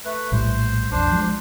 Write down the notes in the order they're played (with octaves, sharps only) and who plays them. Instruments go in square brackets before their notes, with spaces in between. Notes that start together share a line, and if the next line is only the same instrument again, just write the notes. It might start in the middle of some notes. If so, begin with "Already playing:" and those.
[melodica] A3 B4
[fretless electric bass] A#1 A2 G3 [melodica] C5
[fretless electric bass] B1 F2 [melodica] D4 C5
[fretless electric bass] F3 F#3 G#3